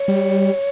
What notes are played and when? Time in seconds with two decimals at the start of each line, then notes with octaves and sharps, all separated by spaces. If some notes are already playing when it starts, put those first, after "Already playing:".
Already playing: C#5
0.08 G3